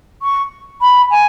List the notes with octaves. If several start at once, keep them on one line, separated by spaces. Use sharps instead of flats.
C#6
B5
G#5